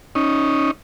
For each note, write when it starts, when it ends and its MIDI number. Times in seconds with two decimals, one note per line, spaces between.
0.15 0.71 61
0.15 0.71 63